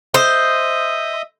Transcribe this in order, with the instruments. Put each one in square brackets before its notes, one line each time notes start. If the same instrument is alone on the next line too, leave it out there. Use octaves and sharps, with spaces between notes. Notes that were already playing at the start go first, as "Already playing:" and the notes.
[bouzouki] C5 [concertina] D#5 E5 D#6